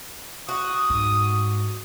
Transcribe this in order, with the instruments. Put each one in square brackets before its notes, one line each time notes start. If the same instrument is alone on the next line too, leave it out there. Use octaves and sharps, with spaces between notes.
[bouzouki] F#4 [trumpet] D#6
[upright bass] G#2